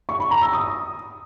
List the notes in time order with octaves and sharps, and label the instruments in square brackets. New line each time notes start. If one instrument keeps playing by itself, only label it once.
[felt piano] C#6
B5
A#5
E6
D#6